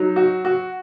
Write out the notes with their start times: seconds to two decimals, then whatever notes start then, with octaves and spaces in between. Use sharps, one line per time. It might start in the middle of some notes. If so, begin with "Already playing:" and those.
Already playing: F#3 D#4
0.16 F#4
0.45 F#4